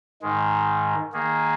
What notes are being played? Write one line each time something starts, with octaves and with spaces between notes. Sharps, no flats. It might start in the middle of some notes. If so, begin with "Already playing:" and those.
G#2 D#3 G#3
D#3 A#3 G#4